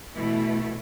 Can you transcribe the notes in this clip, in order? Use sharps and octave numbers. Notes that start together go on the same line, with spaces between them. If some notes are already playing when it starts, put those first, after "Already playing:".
B2 E3 A3 E4